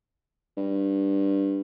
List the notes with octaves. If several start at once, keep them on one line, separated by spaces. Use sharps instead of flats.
G2